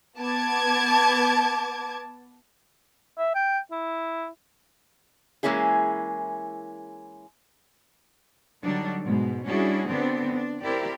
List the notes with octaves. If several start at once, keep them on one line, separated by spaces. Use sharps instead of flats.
B3 A5 D6 G#6
E5
G5
E4
E3 G#3 A#3 C#4 E4 G#4
D3 F#3 G3 D4 D#4
G#2 B2 G#3
G3 C#4 D4 E4 F#4 G#4
D3 B3 C4 D4
D4
C4 E4 G4 A#4 D5